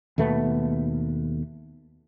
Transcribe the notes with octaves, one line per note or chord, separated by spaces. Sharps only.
D#2 B2 A3 B3